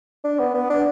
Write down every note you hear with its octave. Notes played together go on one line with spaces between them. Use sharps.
D4
B3
B3
D4